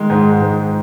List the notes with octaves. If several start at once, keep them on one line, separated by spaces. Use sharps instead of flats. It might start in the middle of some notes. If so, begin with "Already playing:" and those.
Already playing: D#3 G#3
G#2
G#2